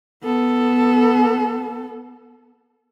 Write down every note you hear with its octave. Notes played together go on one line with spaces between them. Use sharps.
B3 A4